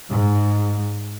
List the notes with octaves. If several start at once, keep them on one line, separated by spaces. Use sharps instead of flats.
G#2